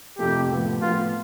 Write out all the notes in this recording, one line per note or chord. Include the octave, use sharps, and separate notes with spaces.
F2 C3 F3 A3 G4
A2 F3 B3
A2 F3 B3 F4